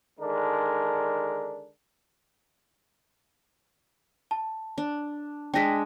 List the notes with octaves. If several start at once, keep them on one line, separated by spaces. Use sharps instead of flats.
D3 D#3 G#3 D4 A#4
A5
D4
G#3 D4 G5 A#6 B6